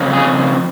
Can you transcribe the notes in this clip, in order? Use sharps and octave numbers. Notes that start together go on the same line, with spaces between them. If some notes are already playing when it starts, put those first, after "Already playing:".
Already playing: F2 C#3
G#4